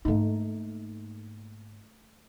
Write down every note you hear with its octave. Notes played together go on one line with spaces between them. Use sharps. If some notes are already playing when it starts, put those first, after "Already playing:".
G#2 A3 A#3 D#4